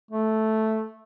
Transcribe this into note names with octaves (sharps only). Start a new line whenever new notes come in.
A3